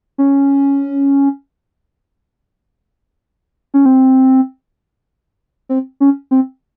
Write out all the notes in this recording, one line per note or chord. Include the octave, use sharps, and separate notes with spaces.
C#4
C#4
C4
C4
C#4
C4